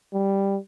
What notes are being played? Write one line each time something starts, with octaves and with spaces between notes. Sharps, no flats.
G3